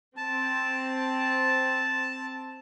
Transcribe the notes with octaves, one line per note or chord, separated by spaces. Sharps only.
C4 A5